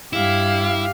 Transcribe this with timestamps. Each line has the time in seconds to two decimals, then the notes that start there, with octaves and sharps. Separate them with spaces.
0.13 G2 E4 G4 F5